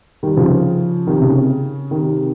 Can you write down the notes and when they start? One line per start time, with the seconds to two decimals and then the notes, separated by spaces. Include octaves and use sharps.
0.23 D#3 G3
0.37 C#3 F3
1.07 C3 D#3
1.22 C#3
1.91 C3 D#3